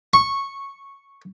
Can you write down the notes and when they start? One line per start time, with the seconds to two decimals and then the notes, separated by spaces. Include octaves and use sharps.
0.14 C#6